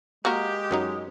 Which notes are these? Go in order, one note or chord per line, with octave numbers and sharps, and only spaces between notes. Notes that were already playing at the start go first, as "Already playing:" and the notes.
G#3 A#3 F#4 G4 A#4
F#2 F#3 D#4